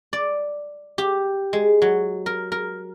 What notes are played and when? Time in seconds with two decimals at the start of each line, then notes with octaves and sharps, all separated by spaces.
0.13 D5
0.98 G4
1.53 G#3
1.82 F#3
2.26 A#4
2.52 A#4